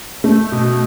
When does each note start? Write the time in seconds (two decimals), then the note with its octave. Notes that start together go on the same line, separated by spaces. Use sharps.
0.24 A3
0.52 B2